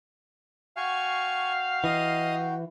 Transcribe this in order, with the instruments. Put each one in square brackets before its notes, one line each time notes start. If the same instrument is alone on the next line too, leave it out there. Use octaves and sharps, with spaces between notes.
[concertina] F#4 G5 [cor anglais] F5 [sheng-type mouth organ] G#5 C#6
[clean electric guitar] E3 [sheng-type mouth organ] D#5